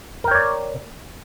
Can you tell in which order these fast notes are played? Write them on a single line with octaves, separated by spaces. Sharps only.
A#4 G5 C#5 D5